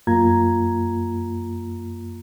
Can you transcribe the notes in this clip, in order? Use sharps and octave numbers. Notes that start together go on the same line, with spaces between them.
F#2 A#3 F4 A#5 G#6